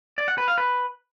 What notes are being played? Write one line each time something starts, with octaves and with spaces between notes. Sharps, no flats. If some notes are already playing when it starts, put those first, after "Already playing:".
D5
F#5
B4
F5
B4